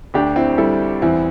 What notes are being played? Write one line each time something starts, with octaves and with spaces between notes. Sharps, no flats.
D2 D4 G4
C4 E4
G3 E4 A4
E2 C4 E4